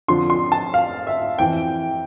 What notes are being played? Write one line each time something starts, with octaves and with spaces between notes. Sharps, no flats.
F2 D3 F3 C6
C6
A5
F5
E5
F2 E3 G5